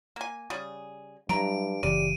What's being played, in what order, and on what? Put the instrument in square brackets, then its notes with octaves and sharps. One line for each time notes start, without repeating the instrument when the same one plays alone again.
[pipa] A#3 G#5
C#3 G3 G#4
[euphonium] G2 [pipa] E3 B4 A#5 [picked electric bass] F#3 [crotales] D7
[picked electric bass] F#1 C#3 E3 [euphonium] G4 [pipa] D5 [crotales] D#7